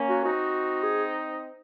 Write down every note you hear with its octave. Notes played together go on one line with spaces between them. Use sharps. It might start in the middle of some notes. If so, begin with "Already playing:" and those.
Already playing: A#3 C#4
F#4
C4 D#4 F#4
G#4